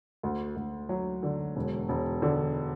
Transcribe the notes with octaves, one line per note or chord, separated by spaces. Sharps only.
D2
D2
F#3
D3
E1
E1
D3